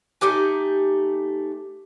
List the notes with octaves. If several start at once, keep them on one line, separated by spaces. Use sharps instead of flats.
A3 D#4 G4 G#5